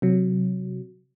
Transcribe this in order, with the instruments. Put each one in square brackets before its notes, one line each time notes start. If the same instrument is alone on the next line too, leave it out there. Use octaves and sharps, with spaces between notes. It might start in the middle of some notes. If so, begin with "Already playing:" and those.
[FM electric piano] C3 F#3